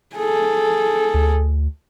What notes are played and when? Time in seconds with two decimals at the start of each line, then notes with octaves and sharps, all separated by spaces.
0.16 G#4 A4
1.14 D2